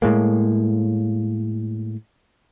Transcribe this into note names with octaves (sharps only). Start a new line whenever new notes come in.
A2 G#3 A#3